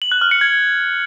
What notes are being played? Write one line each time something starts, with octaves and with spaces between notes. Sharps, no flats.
F#7
F#6
F6
C#7
G#6